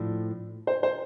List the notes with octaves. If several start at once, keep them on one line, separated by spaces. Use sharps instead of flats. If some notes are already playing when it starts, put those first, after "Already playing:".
Already playing: A2 F3 D4
C5
C5